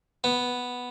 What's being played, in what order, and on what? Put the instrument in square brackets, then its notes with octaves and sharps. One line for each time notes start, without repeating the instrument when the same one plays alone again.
[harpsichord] B3